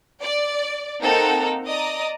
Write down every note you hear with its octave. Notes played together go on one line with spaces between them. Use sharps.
D5
A#3 C4 D#4 A4 A#4 F#5
D5 D#5 A#5 D#6